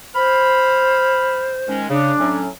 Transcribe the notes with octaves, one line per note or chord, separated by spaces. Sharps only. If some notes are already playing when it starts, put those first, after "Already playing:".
C5 B5 F6
D#3 G#3 C#4
C#3 D4
A2 F#3 C#4